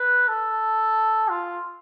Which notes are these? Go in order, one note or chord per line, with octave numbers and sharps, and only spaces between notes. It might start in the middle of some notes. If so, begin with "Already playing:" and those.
Already playing: B4
A4
F4